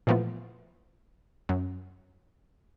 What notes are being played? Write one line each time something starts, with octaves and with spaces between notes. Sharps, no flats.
A#2 E3 F3 A3 B3 F4
F#2